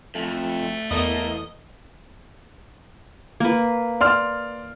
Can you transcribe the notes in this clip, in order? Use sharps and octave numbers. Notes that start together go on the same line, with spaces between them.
F2 A3
E2 A#3 A4 D#5
A#3 B4
D5 C6 F6